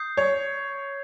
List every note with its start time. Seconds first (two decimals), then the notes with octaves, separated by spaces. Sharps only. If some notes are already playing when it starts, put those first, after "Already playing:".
Already playing: D#6 G6 C7
0.17 C#5